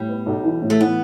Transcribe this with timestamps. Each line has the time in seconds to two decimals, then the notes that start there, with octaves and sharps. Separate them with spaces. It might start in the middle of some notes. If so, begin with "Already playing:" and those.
Already playing: A2 G3
0.09 B3
0.26 B1
0.44 E3
0.62 A2
0.70 A3
0.80 E3 B3